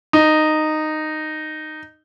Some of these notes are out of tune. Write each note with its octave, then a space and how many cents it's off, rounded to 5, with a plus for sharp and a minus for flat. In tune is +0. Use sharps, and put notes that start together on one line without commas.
D#4 -10